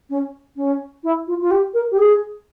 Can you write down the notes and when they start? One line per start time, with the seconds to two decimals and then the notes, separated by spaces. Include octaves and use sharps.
0.10 C#4
0.56 C#4
1.04 E4
1.27 F4
1.41 F4
1.51 G4
1.74 A#4
1.91 G4
1.98 G#4